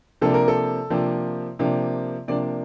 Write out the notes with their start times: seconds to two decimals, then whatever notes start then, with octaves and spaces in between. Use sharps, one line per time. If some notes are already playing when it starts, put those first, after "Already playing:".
0.21 C3 F3 A#3 D4 A4
0.34 A#4
0.48 A4
0.90 C3 F3 A#3 D4
1.59 C3 F3 A#3 D4
2.28 C3 F3 A#3 D4 D5